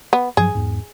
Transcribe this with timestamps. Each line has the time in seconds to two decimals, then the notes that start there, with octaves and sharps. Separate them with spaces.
0.13 B3
0.37 G2 F3 F#3 G#4
0.55 E2 G#2